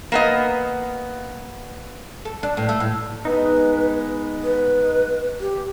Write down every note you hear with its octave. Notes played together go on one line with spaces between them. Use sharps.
A#3 B3 D#5
A4
D4
A2
A3
A2
G#3 B3 D#4 B4
B4
G4